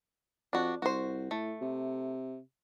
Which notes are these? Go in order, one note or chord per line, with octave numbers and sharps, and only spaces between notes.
F2 D4 F#4
C2 F#4 C5
A2 A3
C3